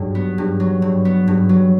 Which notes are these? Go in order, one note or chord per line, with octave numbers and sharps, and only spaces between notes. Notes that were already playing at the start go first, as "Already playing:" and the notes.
Already playing: G2 F#3
B3
G2
F#3
G2
B3
G2
F#3